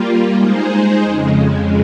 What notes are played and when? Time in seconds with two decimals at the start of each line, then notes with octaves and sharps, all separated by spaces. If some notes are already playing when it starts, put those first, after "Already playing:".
Already playing: G3 A#3 F4
0.34 G#3 D#4 G#4 C5
1.03 F2 C#3 G#3